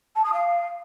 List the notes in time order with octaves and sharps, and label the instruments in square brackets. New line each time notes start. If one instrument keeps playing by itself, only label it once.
[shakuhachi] A5
D#6
F5